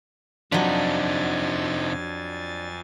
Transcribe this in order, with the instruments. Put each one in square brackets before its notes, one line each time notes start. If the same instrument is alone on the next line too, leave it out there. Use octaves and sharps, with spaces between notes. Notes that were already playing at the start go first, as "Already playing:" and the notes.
[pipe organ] F2 G#5 A6 [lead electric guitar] C3 D#4 [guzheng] F3 F#3 [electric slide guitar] D4